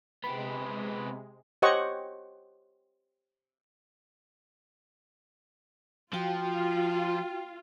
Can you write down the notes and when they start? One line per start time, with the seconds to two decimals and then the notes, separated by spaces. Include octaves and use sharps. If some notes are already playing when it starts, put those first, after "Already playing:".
0.24 C3 G#3 B3 G4 B5
1.62 G4 C5 C#5 D#5 F#5 C#6
6.14 F3 F4 F#4 G5